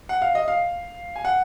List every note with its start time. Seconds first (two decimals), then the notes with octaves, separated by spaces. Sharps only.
0.09 F#5
0.22 F5
0.35 D#5
0.48 F5
1.16 G#5
1.25 F#5